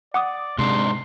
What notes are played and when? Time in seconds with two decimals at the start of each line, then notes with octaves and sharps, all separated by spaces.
0.14 D5 F#5 D6 D#6
0.58 G#2 C3 D4 C6